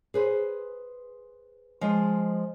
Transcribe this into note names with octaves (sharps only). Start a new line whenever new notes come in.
G#4 B4 C5
F3 G#3 D#5